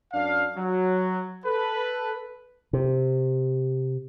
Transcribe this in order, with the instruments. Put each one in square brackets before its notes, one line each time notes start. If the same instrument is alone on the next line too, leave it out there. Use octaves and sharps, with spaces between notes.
[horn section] F#2 D4 F5
F#3
A4 B4
[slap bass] C3